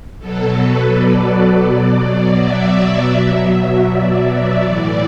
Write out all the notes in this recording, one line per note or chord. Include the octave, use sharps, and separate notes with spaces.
B2 F#3 A4
B4
D5
B2 F#3 D5
E5
B2 F#3
D5
D5
A2 E3 D5